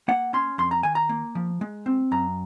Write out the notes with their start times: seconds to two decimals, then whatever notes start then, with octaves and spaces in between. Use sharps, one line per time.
0.08 A#3 F#5
0.33 C#4 C6
0.58 F2 C6
0.71 A#5
0.83 D#3 G#5
0.95 A#5
1.09 A#3
1.35 F3
1.61 G#3
1.86 C4
2.12 F#2 A#5